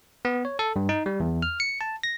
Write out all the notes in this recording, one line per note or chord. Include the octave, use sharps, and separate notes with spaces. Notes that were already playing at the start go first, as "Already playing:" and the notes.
B3
C#5
A4
G2
D#4
G3
E2
F6
C#7
A5
A#6